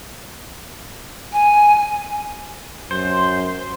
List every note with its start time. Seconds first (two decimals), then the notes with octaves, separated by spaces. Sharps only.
1.33 G#5
2.91 F#2 C5